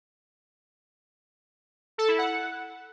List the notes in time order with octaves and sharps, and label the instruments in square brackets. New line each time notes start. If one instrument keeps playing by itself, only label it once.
[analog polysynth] A4
E4
F#5